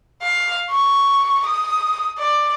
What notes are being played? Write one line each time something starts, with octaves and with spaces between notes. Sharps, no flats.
F5
C#6
D#6
D5